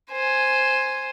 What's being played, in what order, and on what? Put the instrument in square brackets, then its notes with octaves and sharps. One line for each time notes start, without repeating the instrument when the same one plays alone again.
[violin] C5 G#5